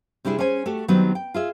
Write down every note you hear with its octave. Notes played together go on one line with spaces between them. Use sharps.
C3 G3 D4 E4 G#4
C#4 G#4 C5 G#5
A3 F#4 G4 A4
D#3 F#3 G3 B3 C4 D#4
G5
F4 G#4 E5